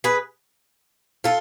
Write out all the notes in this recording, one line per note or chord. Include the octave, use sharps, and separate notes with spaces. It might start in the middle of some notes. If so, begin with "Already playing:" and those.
G#4 B4
F4 A4